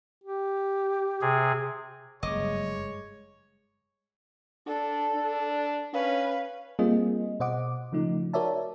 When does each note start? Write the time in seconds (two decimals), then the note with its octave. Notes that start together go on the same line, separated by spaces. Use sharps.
0.24 G4
1.22 C3 G#4
2.23 F#1 G2 G#3 C#5 D#5 D6
4.67 D4 A4
5.15 D4
5.93 C#4 B4 F5
6.79 G3 A#3 C4 F4 G#4 D#5
7.40 B2 C5 D#5 F#5 D6
7.92 C#3 F3 A3 D#4
8.33 F#4 A#4 C#5 D5 E5 A5